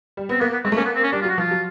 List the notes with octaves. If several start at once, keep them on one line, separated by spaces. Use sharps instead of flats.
G3
B3 C4
A#3 B3
B3
G#3 C4
A3
A#3 C#4
B3
C4
C#4
G3 D4
F4
F#3 F#4
F3 F4
F#3